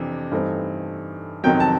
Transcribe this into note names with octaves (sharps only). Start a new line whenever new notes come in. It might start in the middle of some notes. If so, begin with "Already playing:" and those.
Already playing: F2 C3 E3 D4
G2 E3 A3 C4 D#4
F2 C3 D#3 F#3 G5
A5